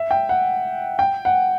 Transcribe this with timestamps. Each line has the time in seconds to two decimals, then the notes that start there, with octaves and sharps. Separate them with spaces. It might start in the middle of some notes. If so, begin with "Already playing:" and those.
Already playing: E5
0.11 G5
0.29 F#5
0.99 G5
1.25 F#5